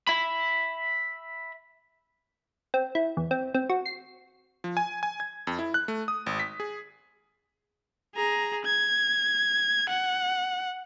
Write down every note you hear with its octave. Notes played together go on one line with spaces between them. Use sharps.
E5 B5
C4
E4
E2
C4
C4
F#4
C7
F3
G#5
G#5
G#6
F2
E4
F#6
A3
D#6
G#1
B6
G#4
G#4 A#5
G#6
F#5